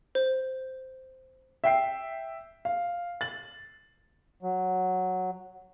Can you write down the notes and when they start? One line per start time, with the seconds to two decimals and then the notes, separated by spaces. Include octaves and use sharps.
0.15 C5
1.64 E5 G5 C7
2.65 F5
3.21 A6 F#7
4.43 F#3